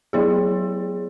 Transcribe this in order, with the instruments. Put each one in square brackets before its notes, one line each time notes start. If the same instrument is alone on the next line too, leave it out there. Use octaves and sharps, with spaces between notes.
[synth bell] F#3 B3 E4 G#4 C#5